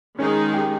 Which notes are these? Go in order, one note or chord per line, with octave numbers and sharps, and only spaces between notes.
D#3 G#3 C#4 D#4 G#4
G4